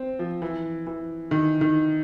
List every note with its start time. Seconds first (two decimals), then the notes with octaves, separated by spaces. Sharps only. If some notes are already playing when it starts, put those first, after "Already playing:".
Already playing: C4
0.19 F3
0.42 E3
0.87 E3
1.31 D#3
1.61 D#3